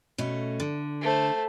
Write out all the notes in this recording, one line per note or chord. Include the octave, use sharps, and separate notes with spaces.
B2 A3 C#4
D3
A3 C5